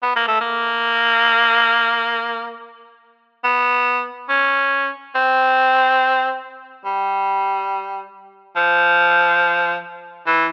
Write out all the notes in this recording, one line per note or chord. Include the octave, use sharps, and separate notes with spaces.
B3
A#3
A3
A#3
B3
C#4
C4
G3
F3
E3